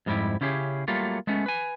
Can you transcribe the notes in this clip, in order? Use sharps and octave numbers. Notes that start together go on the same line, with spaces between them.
F2 G#2 G3 A#3 E4 G4
C#3 C#4 E4 G4 G#4
F#3 G3 A3 A#3 F4
G#3 A3 B3 C#4
B4 G#5